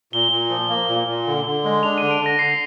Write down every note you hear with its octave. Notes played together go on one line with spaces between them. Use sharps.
A#2 G7
A#2
F3
A#3
A#2
A#2
D3
D3
G#3
D4 F7
D3 D#7
D7
D3
A#6
D3 C7